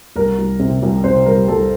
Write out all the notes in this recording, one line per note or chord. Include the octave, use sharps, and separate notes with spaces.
C2 A#4
C2
C3
C2
C3 C5
G3 A#4
C2 A4